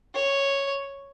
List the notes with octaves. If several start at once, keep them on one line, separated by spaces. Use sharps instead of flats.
C#5